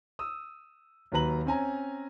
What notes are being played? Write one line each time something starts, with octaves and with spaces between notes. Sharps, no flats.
D#6 E6
D#2 D#3 F#3 B4 A#5 F#7
C4 C#4 G#5 A#5